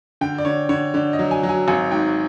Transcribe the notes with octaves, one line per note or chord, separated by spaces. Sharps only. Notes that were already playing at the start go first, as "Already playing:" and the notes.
D3 G5
D5
D3 C#5
D3 C#5
D3 D5
D#5
F#3
G#5
F#3
G#5
G#1 G#5
G#2 G5